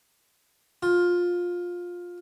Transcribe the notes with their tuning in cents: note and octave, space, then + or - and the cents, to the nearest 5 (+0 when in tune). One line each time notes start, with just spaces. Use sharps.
F4 +15